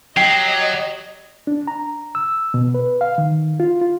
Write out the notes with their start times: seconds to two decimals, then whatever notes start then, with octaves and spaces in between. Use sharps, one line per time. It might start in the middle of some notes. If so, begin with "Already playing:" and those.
0.17 F#3 G4 D#5 C7
1.47 D4
1.67 A#5
2.15 E6
2.54 B2
2.75 B4
3.01 F5
3.18 D#3
3.60 F4
3.81 F4